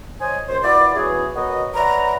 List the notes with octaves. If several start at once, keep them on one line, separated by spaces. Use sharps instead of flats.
C5 C#5 D#5 G#5
C#2 C5
A#2 E4 F#4 B4 D5
E3 B3 C#4 F#4 G#4
B3 F#4 A#4 C#5 D#5
B4 C#5 D5 E5 F#5 A#5